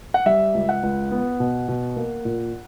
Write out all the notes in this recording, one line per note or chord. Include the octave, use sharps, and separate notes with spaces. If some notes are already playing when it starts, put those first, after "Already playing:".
F#5
G3 E5
C#2
F#5
C#2
B3
B2
B2
A#3
A#2